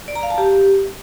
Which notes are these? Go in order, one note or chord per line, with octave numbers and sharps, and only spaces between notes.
D5
A#5
F5
A5
G4